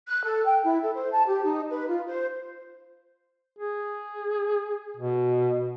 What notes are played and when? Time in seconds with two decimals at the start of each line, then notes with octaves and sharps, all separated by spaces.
0.07 F#6
0.25 A4
0.45 G5
0.64 E4
0.82 A4
0.95 C5
1.12 A5
1.27 G4
1.44 D#4
1.70 B4
1.88 F4
2.07 C5
3.59 G#4
4.97 B2